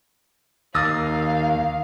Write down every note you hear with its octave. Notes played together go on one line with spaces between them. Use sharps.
D#2 F5 D#6 A6 A#6